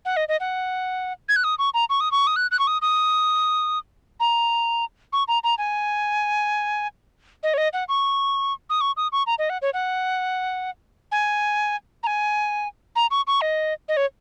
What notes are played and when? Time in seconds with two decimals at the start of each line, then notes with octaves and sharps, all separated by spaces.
0.05 F#5
0.17 D#5
0.28 D#5
0.40 F#5
1.29 G#6
1.36 F#6
1.44 D#6
1.59 C#6
1.74 A#5
1.90 C#6
2.00 D#6
2.12 C#6
2.27 D#6
2.36 F#6
2.51 F#6
2.59 C#6
2.67 D#6
2.82 D#6
4.20 A#5
5.13 C#6
5.28 A#5
5.44 A#5
5.58 G#5
7.43 D#5
7.54 C#5
7.58 D#5
7.73 F#5
7.89 C#6
8.70 D#6
8.81 C#6
8.97 D#6
9.12 C#6
9.27 A#5
9.39 D#5
9.50 F#5
9.62 C#5
9.74 F#5
11.12 G#5
12.03 A#5
12.07 G#5
12.96 A#5
13.11 C#6
13.27 C#6
13.41 D#5
13.88 D#5
13.97 C#5